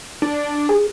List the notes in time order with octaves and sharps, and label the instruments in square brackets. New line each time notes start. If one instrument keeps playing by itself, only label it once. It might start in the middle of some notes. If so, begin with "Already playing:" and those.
[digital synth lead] D4
[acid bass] G#4